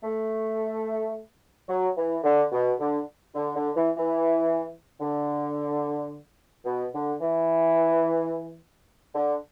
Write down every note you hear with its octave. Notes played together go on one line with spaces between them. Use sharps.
A3
F#3
E3
D3
B2
D3
D3
D3
E3
E3
D3
B2
D3
E3
D3